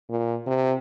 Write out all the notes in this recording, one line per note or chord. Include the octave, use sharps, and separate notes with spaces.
A#2
C3